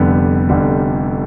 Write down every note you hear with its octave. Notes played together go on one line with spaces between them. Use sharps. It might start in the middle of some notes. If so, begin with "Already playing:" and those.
Already playing: F1 F2 D3 G3 B3
F1 F2 D3 G3